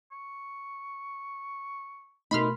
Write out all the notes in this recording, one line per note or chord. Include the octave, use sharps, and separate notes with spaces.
C#6
B2 A3 D#4 A#4 B5 C6 F6